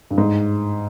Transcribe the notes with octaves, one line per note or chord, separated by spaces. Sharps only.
G2
G#2